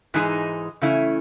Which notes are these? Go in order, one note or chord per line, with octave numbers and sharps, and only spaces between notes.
G#2 E3 G#3 D#4 G#4
C#3 E3 A3 C#4 E4